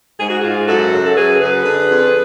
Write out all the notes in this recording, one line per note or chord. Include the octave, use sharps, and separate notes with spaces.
G#2 G#4
F#4
G#2 F4 G#4
F#2 F#4 A4
C#3
A4
F#2 G#4 B4
F#2 G#4 B4
D3
F2